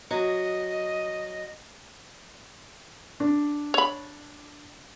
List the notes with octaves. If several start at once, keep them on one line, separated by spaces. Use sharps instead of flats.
F#3 D#5
D4
C#5 B5